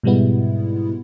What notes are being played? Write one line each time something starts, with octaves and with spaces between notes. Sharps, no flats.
G#2 B2 G3 G#3 B3 E4